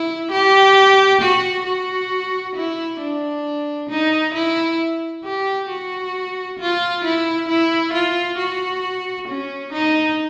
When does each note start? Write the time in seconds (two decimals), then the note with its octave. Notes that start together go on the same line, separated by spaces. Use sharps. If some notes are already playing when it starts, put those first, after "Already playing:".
Already playing: E4
0.32 G4
1.22 F#4
1.66 F#4
2.56 E4
3.00 D4
3.90 D#4
4.34 E4
5.24 G4
5.69 F#4
6.60 F4
7.04 E4
7.48 E4
7.93 F4
8.38 F#4
9.28 C#4
9.73 D#4